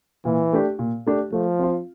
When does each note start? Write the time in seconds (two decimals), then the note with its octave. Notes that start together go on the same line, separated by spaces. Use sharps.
0.25 A#2 E3
0.53 A3 D4 G4
0.79 A#2
1.06 A3 D4 G4
1.32 F3 A3
1.59 C4 F4